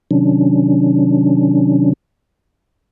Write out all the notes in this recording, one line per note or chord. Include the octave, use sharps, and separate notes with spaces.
C3 D#3 F#3 C#4 D4